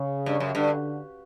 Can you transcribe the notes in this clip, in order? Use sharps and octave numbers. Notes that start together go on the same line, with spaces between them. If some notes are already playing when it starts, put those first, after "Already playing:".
Already playing: C#3
G2
F#2
G2 D3